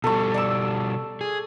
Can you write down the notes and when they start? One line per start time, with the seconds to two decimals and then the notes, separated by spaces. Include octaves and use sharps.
0.04 B2 G3 A4 C#6
0.34 D5 E6
1.21 G#4